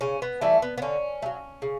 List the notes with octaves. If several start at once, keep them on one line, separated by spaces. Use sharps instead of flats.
C#3 C#4
B3
E3 G3 A3
B3
B3
D3 C#4
A3
F#3
C#3